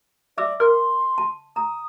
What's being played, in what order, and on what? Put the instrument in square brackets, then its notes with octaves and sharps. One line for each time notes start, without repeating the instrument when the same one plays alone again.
[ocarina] D5 [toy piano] E5 D6 E6
[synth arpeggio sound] A#4 [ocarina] C6
[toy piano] A5
[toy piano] A#5 [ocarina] D#6